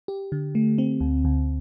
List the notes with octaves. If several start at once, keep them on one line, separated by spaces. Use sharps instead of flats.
G4
D3
A3
C4
D2
D2